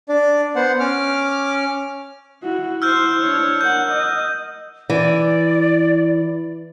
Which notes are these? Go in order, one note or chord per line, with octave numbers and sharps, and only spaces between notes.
D4 D5
B3 C5 F#5
C#4 D6 F6
E4 F#4
E4 C5 E6 F6 G6
D4 C#5
A#4 F#5 G6
D#5
E3 D5